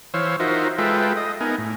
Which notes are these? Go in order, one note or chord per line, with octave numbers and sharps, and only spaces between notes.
E3 C5 C#5 F5 E6
D#4 F4 F#4 A#4 C5 E5
G#3 F4 A4 B4 E5 G5
D#5
B3 D#4 A#4 G#5
A2